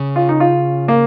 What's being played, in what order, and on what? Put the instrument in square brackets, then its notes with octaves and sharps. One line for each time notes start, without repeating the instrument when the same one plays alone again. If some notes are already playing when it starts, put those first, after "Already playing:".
Already playing: [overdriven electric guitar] C#3
[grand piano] F4
D#4
F4
A#3